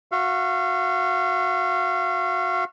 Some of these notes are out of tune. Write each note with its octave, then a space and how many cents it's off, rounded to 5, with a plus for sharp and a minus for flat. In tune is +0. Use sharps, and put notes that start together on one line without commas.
F#4 -20 F5 -35